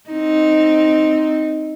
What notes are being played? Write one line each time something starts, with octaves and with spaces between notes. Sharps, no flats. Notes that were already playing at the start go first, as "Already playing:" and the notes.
C4 D#4